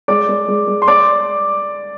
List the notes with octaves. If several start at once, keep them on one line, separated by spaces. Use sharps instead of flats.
G#3 D5 D6
G#3
G#3
G#3
C6
D5 D6